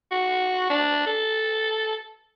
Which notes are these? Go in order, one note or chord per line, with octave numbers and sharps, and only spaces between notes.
F#4
D4
A4